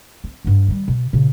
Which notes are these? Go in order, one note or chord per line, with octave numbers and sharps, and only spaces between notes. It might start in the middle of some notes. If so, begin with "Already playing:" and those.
C4
G2 B3
D#3 G3
B2
A#2 C#3